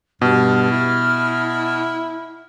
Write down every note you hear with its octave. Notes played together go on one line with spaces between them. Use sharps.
G2 B2 F6
E4